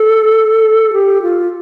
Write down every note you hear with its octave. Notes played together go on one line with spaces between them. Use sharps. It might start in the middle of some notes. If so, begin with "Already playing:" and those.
Already playing: A4
G4
F4